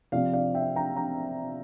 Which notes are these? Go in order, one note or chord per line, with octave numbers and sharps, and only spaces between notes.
C3 F3 C4 D5 F5
D5 F5
E5 G5
G5 A#5
G5 A#5